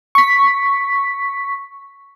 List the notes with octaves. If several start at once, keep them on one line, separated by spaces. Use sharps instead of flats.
C#6 B6